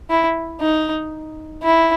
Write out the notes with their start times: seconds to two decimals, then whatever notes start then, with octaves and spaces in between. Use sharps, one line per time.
0.10 E4
0.61 D#4
1.63 E4